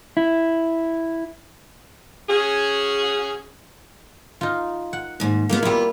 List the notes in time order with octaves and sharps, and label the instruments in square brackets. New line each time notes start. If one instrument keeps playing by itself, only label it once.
[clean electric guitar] E4
[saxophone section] C#4 F#4 G#4
[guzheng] D#4 F4
F#5
[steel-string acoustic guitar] D#2 G#2
[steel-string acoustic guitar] A#2 G#3 B3 [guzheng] A#3
[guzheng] G3 E4 [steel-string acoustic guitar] B3 F4